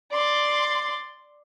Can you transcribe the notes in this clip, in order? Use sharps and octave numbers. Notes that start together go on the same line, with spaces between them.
D5 C6